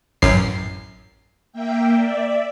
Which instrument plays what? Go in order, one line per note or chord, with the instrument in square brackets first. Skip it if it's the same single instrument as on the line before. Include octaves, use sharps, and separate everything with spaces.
[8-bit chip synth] A1 F#2 C7
[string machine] A#3 E5 G5
D5 E5